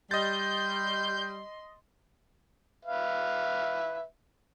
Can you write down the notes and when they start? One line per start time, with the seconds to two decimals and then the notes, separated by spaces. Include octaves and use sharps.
0.11 G3 D#5 C6 G6 A6
2.85 B4 E5 F5